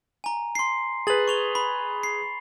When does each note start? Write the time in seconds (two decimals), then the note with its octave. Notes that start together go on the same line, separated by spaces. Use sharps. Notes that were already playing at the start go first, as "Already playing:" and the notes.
0.24 G#5 A#5
0.55 C6 C7
1.07 G#4 B4 A6 F#7
1.28 C#6 F7 G7
1.55 B5
2.03 C7